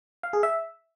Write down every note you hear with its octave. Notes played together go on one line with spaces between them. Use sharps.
F5
G#4
E5